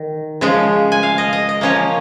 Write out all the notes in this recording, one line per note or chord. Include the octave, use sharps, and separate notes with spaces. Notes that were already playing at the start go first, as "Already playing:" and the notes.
Already playing: D#3
C#3 F3 G#3
G#5
F5
D#5
D#5
D#5
F3 A#3 C#4 C#5